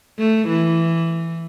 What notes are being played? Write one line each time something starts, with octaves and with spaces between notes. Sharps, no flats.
A3
E3